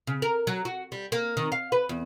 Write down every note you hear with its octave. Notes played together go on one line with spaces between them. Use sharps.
C#3
A#4
F#3
F#4
G3
A#3
D#3
F5
B4
E2